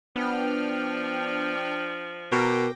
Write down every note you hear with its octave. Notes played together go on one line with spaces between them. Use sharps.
F3 B3 D4 G5 F6
B2 A#4 G5 D6 A#6